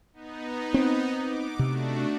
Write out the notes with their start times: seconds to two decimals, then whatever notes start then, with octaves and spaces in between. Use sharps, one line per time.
0.13 B3 D#4
0.74 C4
1.22 D6
1.59 C3 A3 D4 F#4